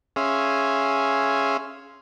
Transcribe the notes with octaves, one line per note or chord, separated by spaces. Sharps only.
C#4 G#4 E5 F5 C6